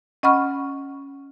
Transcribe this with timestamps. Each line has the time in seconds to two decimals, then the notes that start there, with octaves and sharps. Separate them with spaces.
0.23 C#4 D#5 F#5 B5 C#6 F6